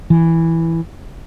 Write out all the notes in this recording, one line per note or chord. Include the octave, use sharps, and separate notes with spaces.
E3